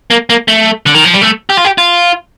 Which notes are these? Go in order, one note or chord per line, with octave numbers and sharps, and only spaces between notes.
A#3
A#3
A3
D3
D#3
F3
G3
A3
G4
F4
G4
F4